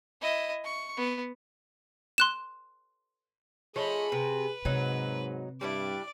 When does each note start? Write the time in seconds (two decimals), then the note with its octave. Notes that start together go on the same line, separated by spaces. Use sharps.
0.22 E4 D#5
0.64 C#6
0.97 B3
2.18 C6 F#6 E7
3.76 F3 A3 G#4 C#5 D#5 B5
4.12 C3 B4
4.65 G#2 C3 F#3 D#4
5.61 G2 G3 D4 E4 D5